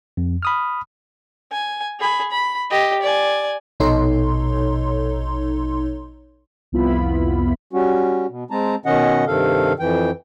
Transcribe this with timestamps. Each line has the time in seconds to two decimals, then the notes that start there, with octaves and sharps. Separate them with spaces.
0.17 F2
0.43 B5 D#6 F6
1.52 G#5
2.00 G#4 B5
2.31 B5
2.71 G4 D#5
3.02 D5 G#5
3.80 A#1 B2 D#4 A4 C#5 C6
6.72 C2 F2 B3 E4 F4 B5
7.73 G3 C#4 F#4
8.29 B2
8.51 G#3 C4 A5 A#5
8.86 B2 D#3 C#4 D#5 F#5
9.27 G2 C3 D#3 A4 F5
9.79 F2 E3 G5